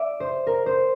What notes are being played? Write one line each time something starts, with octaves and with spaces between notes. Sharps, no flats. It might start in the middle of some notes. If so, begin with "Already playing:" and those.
Already playing: D5 E5
C5
A#4
C5